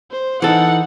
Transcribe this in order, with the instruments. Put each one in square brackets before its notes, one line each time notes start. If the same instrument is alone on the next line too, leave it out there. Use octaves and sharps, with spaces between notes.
[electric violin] C5
[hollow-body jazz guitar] E3 A4 [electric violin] D#4 F#5